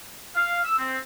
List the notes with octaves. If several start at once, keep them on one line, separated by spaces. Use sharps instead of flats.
F5
E6
C4